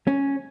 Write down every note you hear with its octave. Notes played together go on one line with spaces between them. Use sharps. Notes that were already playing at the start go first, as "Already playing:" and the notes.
C#4